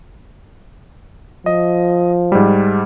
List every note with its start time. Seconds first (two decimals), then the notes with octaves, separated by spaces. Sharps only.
1.46 F3 D#5
2.32 G#2 G3